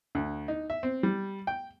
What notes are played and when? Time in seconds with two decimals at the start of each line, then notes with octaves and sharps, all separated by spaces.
0.15 D2
0.48 D#4
0.70 E5
0.83 C4
1.03 G3
1.47 G5